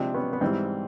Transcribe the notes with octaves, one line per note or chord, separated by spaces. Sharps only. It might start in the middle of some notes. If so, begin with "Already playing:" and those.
Already playing: C3 F3 G#3 C4 D4
B3 C#4
B3
G#2 E3 G3 C4